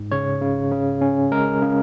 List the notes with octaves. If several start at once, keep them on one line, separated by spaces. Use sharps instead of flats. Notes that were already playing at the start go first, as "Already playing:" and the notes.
Already playing: G#2
C#3 C#5
C#3
C#3
C#4
G#3 A#4
C#3